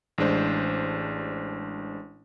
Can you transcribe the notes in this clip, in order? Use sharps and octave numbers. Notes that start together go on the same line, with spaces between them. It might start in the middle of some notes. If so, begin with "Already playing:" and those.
A1 G#3 D4 C5